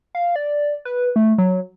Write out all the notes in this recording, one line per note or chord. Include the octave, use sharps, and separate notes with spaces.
F5
D5
B4
A3
F#3